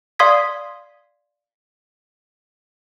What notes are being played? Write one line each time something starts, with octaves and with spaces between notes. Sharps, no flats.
D5 F5 C6 D#6 G#6 B6